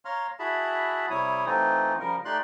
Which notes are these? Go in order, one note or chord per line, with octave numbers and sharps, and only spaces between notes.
C#5 F5 A#5 C6 F6
E4 F#4 G#4 E5 A5 B5
C3 G3 E4 C#5 D#6
E3 A3 C4 D#4 F4
C#3 F3 G3 A#4
A3 D#4 G4 D5 C6 F#6